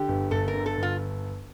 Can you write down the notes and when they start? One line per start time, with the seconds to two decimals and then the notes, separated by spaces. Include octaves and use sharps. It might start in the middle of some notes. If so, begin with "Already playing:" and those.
Already playing: D3 G4
0.08 G1
0.31 G1 A4
0.48 A#4
0.53 D3
0.66 A4
0.77 G1
0.83 F4